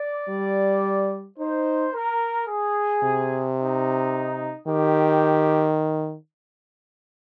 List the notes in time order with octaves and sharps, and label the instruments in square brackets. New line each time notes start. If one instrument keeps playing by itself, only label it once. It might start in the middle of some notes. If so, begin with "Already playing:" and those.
Already playing: [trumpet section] D5
[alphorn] G3
[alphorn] D#4 [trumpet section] C5
[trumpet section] A#4
G#4
[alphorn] C3
[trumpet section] D#4
[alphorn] D#3 [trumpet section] G4